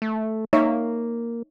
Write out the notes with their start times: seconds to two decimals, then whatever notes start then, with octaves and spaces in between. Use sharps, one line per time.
0.02 A3
0.53 A#3 D#4 C#5 E5